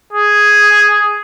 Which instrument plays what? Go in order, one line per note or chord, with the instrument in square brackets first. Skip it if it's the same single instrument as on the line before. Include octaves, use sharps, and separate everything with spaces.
[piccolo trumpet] G#4